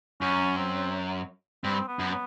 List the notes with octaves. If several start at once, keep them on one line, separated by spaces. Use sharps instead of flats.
F#2 C#4
C4
G2 C4
B3
F#2
B3